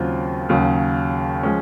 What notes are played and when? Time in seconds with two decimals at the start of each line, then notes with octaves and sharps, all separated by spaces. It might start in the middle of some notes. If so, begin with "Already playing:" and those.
Already playing: D#2 C#3 F#3 C4 F4
0.49 D#2 C#3 F#3
1.43 F3 G#3 C#4